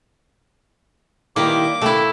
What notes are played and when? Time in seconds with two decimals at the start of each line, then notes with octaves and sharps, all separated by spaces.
1.36 D#3 G3 A#3 E4 D6
1.82 C3 A3 E4